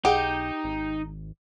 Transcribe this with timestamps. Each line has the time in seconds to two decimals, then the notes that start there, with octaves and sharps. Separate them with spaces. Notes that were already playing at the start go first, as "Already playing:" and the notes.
0.05 B1 D#4 G4 G#4 F#5
0.64 G#1